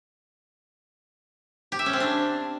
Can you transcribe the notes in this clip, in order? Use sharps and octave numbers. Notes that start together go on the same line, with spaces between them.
G4
E5
C#4
C4
D4